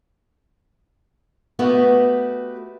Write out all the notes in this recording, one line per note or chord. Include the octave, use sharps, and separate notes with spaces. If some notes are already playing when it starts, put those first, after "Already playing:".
A3 B3 F#4 G4 B4 D#5